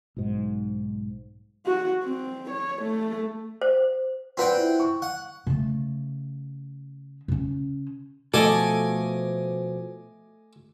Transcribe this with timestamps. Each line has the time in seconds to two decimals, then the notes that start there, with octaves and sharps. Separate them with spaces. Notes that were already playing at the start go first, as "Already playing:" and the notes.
0.17 B1 G#2
1.66 F#4
2.03 C4
2.51 C#5
2.83 A3
3.62 C5
4.37 C4 F4 B4 D5 F#5 G5
4.57 E4
4.80 C#6
5.02 F#5
5.47 C#3 A3
7.28 C#3 C#4
8.34 B2 F3 A3 A4 D#5 G#5 D6